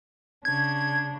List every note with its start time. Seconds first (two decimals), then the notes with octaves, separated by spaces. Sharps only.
0.45 C#3 D4 G#6